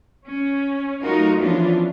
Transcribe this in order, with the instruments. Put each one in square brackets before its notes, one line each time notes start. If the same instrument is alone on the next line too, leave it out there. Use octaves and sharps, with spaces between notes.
[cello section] C#4
F#3 A3 D#4 F4 F#4 A#4
E3 F3 B3 C#4 D4 F4